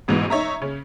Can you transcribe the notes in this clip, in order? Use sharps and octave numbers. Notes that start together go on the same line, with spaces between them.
A1 G#2 B2 E3
D#4 C#5 E5 A#5
C#3 C#4